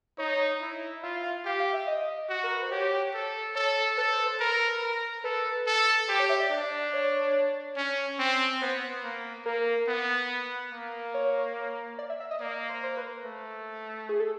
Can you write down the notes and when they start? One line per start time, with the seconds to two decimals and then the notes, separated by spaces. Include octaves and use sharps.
0.18 D#4 C#5
0.61 E4
1.03 F4 E5
1.24 F5
1.45 G4 F5
1.60 F5
1.73 E5
1.87 D#5
2.29 F#4
2.44 A#4
2.53 B4
2.62 C5
2.71 G4 C#5
3.14 A4
3.55 A4 C#5
3.97 A4 B4
4.13 C5
4.26 C5
4.40 A#4 B4
4.82 A#4
5.24 A4 B4
5.67 A4
6.08 G4 C5
6.20 C#5
6.29 E5
6.40 D5
6.51 D4
6.94 C#5
7.77 C#4
8.19 C4
8.62 B3 C5
9.04 A#3
9.46 A#3 A#4
9.88 B3
10.72 A#3
11.14 C#5
11.99 D5
12.10 E5
12.20 E5
12.31 D#5
12.40 A#3 D5
12.69 C5
12.84 C5
12.97 B4
13.25 A3
14.09 G#4
14.20 A4